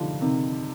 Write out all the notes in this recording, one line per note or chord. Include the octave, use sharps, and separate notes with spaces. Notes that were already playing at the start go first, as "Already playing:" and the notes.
Already playing: D3 D#3 F3 G3
C3 D#3